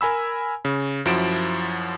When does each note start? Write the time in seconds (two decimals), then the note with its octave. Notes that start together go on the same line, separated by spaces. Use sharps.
0.01 A#4 G#5 B5 E6
0.65 C#3
1.05 F#2 F3 E4 F#4 D7 E7